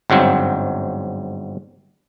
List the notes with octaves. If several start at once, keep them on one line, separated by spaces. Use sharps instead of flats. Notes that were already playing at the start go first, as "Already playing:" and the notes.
G1 G#2 F#3 C4